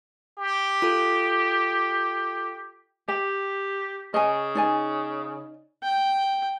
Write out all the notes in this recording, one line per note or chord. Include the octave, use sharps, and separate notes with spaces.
G4
F4 A4
G4 G5
C#3 D#5 G#5
D#4 D5 G#5
G5